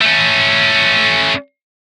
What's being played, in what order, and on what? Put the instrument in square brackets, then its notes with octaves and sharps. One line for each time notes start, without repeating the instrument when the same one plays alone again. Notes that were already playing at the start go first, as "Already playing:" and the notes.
[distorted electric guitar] A3 C#4